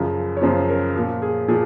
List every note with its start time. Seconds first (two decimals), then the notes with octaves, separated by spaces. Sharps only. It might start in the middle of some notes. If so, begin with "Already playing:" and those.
Already playing: F#2 C#3 F3
0.37 C#5
0.42 F#2 C#3 F3 C5
0.69 A#4
0.95 A#2 F3
1.22 G#4
1.48 A#2 F3 G#4